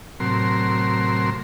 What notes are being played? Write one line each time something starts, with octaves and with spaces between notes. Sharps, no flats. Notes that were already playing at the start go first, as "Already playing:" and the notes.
A2 C3 F#3 A#4 C6